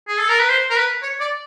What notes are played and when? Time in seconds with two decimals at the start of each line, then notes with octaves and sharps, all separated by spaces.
0.08 G#4
0.19 A4
0.29 A#4
0.39 B4
0.49 C5
0.70 A#4
0.77 B4
1.02 C#5
1.20 D5